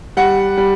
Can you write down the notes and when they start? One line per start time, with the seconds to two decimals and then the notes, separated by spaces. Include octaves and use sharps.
0.17 G3 F#5
0.57 G3